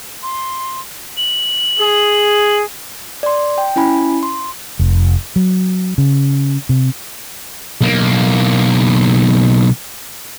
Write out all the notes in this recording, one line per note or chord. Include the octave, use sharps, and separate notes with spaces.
C6
F#7
G#4
D5 C6
G5
C#4 E4 G#5 B5
C6
F1
F#3
C#3
C3
B1 A#3